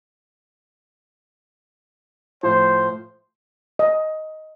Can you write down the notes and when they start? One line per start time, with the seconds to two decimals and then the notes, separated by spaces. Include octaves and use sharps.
2.43 A2 F3 C5
3.79 D#5